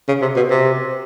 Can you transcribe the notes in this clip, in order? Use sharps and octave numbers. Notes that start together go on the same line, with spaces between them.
C#3
C3
B2
C3